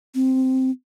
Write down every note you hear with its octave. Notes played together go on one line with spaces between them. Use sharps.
C4